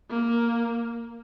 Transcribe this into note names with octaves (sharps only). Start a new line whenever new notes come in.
A#3